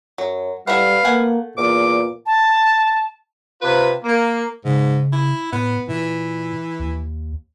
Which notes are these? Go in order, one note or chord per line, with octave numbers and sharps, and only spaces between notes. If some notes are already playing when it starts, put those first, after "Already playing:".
F#2 F#3
G3 E4 A4 B4 F5 F#5
A3 A#3 F#5 G#5
E2 A#2 D6
A5
C3 F4 B4
A#3
G#2 C#3
E4
A2 B3
A#2 E3
D#2